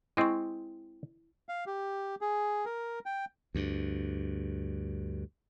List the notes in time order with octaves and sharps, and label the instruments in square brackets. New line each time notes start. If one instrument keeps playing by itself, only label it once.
[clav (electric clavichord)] G#3 C4 [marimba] E4 D#5 C#6
[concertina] F5
G4
G#4
A#4
G5
[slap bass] D2 G2